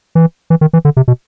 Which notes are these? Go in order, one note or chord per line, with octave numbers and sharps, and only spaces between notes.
E3
E3
D#3
E3
D3
C3
B2